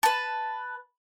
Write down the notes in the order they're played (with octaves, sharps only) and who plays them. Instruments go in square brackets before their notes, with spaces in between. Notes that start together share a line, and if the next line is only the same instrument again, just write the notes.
[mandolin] B4 A5